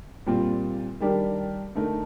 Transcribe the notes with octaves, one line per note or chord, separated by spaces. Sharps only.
A#2 G3 C4 F4
D#3 G3 D4 G4 A#4
D3 A3 D#4 A#4